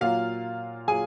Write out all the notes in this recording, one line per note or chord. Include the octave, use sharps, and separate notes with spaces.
A#2 F#3 A#3 F4 F5
A#2 F#3 G#4 G#5